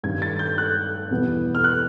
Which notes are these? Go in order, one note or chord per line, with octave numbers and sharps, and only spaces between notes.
G2 D#3 G3 G#6
A6
G6
F#6
E2 B2 G3 B3
F6
F#6